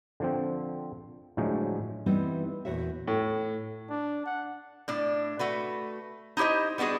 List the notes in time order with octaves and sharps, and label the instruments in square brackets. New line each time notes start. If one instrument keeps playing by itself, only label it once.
[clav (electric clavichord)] D3 F3 C4
A2 D3 F3 F#3 G#3
[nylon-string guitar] E3 G3 B3 C4 D#4 E4
E2 A#2 F#4 C#5 E5
[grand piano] A2
[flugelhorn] D4
F#5
[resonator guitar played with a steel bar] A2 D4
A3 F#4 B4
D#4 E4 G4 C5 D#5
G3 B3 D4 F#4 G#4